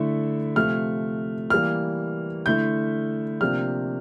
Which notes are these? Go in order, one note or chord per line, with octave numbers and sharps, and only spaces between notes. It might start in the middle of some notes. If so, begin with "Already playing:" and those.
Already playing: D3 A3 E4
C3 F3 A3 F6
E3 G3 A#3 F6
D3 A3 E4 G6
C3 F3 A#3 D4 F6